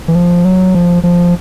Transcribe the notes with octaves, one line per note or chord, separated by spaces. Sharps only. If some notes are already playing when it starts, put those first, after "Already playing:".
E3
F3
F#3
F3
F3